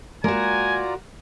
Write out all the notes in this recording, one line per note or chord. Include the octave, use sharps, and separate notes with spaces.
G#3 A#3 F4 F#4 A#4 D5 G#5 A#5